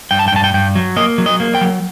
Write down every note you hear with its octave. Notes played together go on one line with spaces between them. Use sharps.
G2 G5
A5
G5
G2 A5
G5
G2 G5
F#3
A#3 D#5
F#3
D#5
A#3
G5
F#3